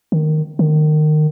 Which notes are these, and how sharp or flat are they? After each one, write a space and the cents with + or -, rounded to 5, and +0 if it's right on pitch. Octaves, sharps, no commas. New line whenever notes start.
D#3 -10
D#3 -25